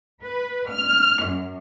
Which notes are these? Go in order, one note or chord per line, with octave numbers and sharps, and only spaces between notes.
B4
F6
F#2